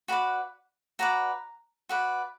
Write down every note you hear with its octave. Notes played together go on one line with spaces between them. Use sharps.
F#4 B4 D5 B5
F#4 B4 D5 A#5
F#4 B4 D5